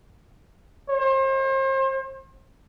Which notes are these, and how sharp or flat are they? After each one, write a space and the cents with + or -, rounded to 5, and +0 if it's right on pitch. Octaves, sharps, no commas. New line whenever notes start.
C5 +40